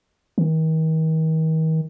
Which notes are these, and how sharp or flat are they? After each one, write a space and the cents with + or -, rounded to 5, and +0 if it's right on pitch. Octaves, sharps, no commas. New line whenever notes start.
D#3 +40